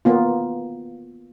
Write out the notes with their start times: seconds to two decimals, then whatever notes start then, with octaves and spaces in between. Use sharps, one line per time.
0.05 A#3 B3 F4